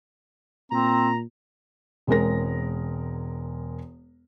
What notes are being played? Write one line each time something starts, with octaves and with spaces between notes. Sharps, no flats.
A#2 C4 A#5
E1 G#3 C4 A#4 A#6